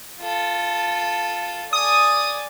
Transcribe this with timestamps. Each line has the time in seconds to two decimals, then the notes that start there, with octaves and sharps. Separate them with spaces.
0.20 F4 A4
1.73 D5 G#5 D#6